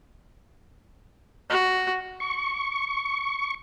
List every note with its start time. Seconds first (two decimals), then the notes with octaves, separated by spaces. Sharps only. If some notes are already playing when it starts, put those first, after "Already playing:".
1.50 F#4
2.20 C#6